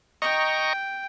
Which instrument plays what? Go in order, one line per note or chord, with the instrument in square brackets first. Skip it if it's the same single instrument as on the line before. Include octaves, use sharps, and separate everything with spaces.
[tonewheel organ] D#5 A#5 C#6 [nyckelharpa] G5